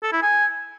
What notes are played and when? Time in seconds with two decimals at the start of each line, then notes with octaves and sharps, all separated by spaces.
0.03 A4
0.12 E4
0.22 G#5